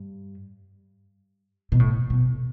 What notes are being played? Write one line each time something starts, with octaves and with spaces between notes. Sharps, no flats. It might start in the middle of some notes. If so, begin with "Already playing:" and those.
Already playing: G2
B2
A2
B2